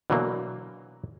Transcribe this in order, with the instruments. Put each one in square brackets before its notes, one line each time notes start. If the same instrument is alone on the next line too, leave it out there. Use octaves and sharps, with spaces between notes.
[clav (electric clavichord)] B2 D3 E3 F#3 A#3